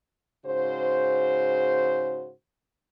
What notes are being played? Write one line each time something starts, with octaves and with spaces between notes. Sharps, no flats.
G#2 C#3 F#4 C5